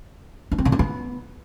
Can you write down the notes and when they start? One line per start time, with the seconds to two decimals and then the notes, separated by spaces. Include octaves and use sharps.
0.52 D4
0.58 C4
0.65 D3
0.72 C#4
0.79 B3